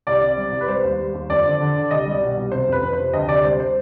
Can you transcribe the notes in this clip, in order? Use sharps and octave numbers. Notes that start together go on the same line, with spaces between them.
C2 D5
C3
G3
C2
B4
G3 C5
D#2
G3
D#2
F2 D5
D3
D3
D3
C2 D#5
G3
D5
B2
C2
C3 C5
F2
B4
F2
C3 C5
D2 D#5
C3 D5
G3 C5
C5